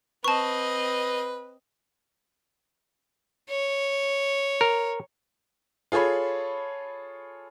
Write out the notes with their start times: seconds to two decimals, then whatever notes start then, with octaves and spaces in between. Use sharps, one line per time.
0.24 C4 B4 D#5 A5 C#6
3.49 C#5
4.61 A#4
5.92 F4 G#4 A4 C#5 B5